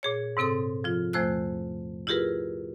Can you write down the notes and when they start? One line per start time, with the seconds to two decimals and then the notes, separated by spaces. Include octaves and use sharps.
0.03 A#2 G#4 C#5
0.37 G#2 C3 C4 A4 D#6
0.84 F3 F4
1.13 E2 F3 A3 C5 E6 F#6
2.07 E4 F4 G4 G#4 A#4 B4